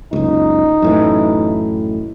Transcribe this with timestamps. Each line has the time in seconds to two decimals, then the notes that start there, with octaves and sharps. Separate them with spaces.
0.13 F#1 C#2 D#4
0.82 F#2 A2 E3